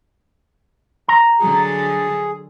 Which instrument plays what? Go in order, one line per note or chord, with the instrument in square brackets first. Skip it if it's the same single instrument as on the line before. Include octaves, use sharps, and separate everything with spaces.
[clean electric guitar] A#5
[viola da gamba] D3 F#3 [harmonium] G#4